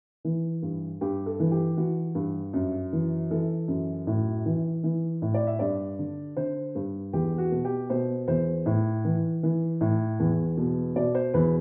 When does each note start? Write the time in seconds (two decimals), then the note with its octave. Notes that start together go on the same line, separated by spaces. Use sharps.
0.25 E3
0.62 G2
1.01 G2 G4
1.26 A4
1.40 E3
1.51 G4
1.77 E3 F#4
2.15 G2
2.53 F#2
2.93 E3
3.31 E3 A4
3.68 F#2
4.07 A2
4.46 E3
4.84 E3
5.22 A2
5.34 D5
5.47 E5
5.59 G2 D5
5.99 D3
6.37 D3 C5
6.75 G2
7.13 E2 G4
7.38 F#4
7.52 B2
7.65 G4
7.90 B2 C5
8.28 E2 C5
8.66 A2
9.05 E3
9.43 E3
9.81 A2
10.19 E2
10.57 B2
10.96 B2 D5
11.15 C5
11.34 E2 B4